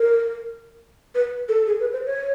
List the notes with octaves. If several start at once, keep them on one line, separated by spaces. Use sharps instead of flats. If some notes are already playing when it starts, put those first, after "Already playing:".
Already playing: A#4
B4
A4
G#4
B4
C5
C#5